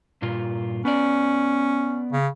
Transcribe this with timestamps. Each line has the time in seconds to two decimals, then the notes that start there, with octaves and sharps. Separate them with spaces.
0.22 G2 A#2 F4
0.85 B3 C#4 D5
2.12 C#3